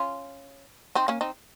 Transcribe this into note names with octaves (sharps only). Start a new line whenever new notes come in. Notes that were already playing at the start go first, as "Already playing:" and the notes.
Already playing: C#4 F4
C4 D#4
A#3 C#4
C4 D#4